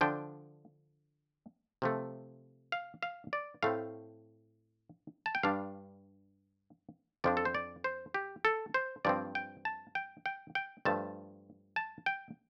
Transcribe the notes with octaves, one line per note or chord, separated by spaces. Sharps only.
D3 F3 D4 G5
C3 F3 A3
F5
F5
D5
A2 A3 C4 F5
A5
G5
G2 G3 D4 F5
F2 F3 D4 D5
A4
C5
D5
C5
G4
A4
C5
G2 F3 C4 D5
G5
A5
G5
G5
G5
G2 F3 A3 A5
A5
G5